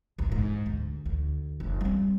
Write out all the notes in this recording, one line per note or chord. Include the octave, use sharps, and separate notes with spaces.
D#1 C2
G#2
D2
D2
F1
G3 C4